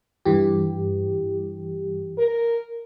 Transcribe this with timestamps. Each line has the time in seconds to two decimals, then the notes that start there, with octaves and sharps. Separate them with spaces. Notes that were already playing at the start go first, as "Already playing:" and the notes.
0.26 G2 E3 G4
2.18 A#4